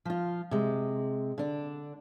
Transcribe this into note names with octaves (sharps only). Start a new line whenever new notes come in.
F3 F4
C3 G#3
D3 D4